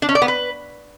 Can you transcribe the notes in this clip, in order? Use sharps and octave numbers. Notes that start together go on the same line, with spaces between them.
D4
C#4
D5
B3
B4